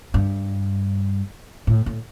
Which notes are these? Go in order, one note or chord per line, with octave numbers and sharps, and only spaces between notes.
G2
A2
A2